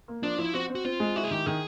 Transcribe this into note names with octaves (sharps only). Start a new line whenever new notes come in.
A#3
F3 D4
F3 E4
C4 F#4
C4
F#4
C4 F4
G#3
E4 F#4
G#4
D#3 G4
D#3 G#4